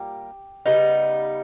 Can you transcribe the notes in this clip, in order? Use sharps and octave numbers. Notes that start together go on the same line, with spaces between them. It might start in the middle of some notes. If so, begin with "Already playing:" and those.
Already playing: A#2 G3 A#3 G4
C#3 G3 B3 D#4